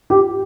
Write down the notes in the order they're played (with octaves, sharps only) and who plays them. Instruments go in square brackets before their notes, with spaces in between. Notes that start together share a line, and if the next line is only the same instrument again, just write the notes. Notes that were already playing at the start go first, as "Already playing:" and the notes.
[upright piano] G4